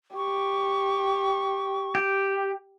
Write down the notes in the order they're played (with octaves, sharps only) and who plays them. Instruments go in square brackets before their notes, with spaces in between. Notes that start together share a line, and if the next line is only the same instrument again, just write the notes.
[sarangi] G4 [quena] C#6
[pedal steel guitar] G4